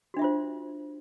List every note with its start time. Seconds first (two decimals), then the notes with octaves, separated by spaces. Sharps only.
0.14 F#4
0.17 D4
0.19 E5
0.22 F4
0.24 C5